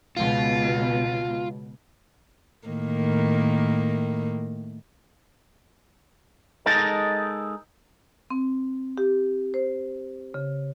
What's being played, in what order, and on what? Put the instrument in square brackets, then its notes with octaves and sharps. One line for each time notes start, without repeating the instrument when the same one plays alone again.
[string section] C#2 B2 [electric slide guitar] F4
[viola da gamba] A2 D#3 A#3
[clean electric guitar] G#3 D#4 A4 A#4
[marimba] C4
G4
C5
C#3